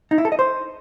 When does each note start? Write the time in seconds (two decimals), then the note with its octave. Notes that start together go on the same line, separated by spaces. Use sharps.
0.11 D#4
0.18 E4
0.25 A4
0.32 D#5
0.39 C5